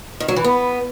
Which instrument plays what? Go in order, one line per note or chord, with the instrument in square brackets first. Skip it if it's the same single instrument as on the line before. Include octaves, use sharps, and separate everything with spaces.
[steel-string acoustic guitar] D#3
F#3
E3
B3